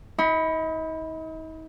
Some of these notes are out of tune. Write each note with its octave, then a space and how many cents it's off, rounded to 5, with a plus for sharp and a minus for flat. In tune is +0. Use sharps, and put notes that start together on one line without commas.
D#4 +40 B5 +0